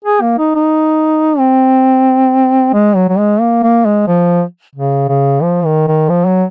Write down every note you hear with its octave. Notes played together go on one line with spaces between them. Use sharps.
G#4
A#3
D#4
D#4
C4
G#3
F#3
F#3
G#3
A#3
A#3
G#3
F3
C#3
C#3
F3
D#3
D#3
F3
F#3